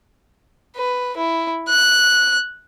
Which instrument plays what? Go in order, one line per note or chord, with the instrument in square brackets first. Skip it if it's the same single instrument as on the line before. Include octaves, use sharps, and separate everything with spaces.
[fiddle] B4
E4
F#6